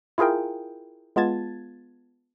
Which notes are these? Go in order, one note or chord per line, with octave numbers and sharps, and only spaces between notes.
E4 F4 G#4 A#4 G5
G#3 B3 F4 A5 G#6 A6